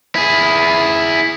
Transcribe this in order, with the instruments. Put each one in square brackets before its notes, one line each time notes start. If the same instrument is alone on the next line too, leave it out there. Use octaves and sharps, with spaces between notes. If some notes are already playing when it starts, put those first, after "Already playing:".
[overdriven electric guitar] E4 G#4